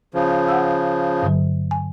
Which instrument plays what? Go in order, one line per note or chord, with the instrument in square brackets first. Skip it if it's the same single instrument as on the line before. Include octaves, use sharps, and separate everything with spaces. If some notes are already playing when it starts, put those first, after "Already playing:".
[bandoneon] C#3 F3
[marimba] F#5 E6
G2 D3 F#3
G#5